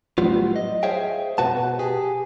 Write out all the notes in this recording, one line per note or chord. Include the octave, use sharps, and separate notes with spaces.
A2 F#3 G3 B3 F4
D#5
G#4 C5 C#5 E5 F5 G5
B2 F#4 B4 F#5 A5
G4 G#4